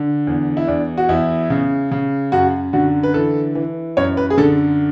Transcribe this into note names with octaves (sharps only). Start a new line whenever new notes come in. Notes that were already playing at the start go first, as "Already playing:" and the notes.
Already playing: D3
E2
E4
E2 D4
F#4
E2 E4
C#3
C#3
F#2 F#4
D3 F#4
B4
E3 A4
E3
F#2 C#5
B4
G#4
D3 A4